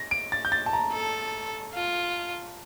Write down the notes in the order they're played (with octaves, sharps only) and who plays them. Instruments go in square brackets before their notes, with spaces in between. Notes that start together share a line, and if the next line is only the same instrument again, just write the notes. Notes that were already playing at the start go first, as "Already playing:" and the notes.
Already playing: [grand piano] A#6
D7
A6
G6
A6
A5
A#5
[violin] A4
F4